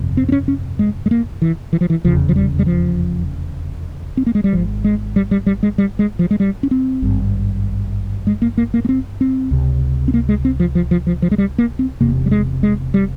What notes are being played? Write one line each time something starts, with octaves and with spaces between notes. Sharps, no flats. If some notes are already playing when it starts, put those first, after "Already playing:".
Already playing: G1 F2 C3
C4
C4
C#4
C#4
G#3
G#3
A#3
E3
E3
F3
E3
F1 E2 C#3 F3
F3
G3
G3
F3
C4
A#3
G#3
G3
G#1 G#2 F3
G#3
G3
G3
G3
G#3
G3
G#3
F3
G#3
G3
C#4
C4
G#1 G2
G#3
A#3
A#3
A#3
A#3
C4
C4
C#2 C3
C4
A#3
G#3
C4
F3
F3
F3
F3
F3
G#3
G3
A#3
C4
E1 E2 C3 A#3
G3
G#3
G#3
G3